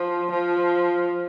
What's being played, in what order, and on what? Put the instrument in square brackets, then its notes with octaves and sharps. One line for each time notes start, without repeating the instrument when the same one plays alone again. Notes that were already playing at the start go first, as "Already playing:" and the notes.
Already playing: [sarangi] F3
F3